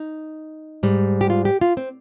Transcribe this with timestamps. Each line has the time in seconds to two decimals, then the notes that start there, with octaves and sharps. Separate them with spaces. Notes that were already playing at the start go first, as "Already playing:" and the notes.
Already playing: D#4
0.83 G#2 G3
1.21 G4
1.30 F4
1.45 G4
1.61 F4
1.77 C4